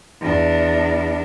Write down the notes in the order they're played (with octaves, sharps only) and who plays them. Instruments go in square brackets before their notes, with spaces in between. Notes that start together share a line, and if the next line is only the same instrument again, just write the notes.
[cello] E2 D4